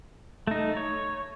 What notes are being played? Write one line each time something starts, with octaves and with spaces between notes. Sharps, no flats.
A3 D#4
C#5